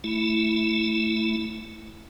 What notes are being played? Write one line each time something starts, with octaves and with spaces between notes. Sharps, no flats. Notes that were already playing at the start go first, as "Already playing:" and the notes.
A3 E4